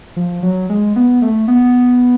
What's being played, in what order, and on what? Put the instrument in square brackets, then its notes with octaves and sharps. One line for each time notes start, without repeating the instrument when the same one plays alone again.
[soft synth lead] F3
F#3
G#3
B3
A3
B3